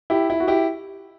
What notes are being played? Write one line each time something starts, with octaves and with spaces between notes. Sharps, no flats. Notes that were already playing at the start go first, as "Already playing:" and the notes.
E4 G4
E4
F#4
E4 G4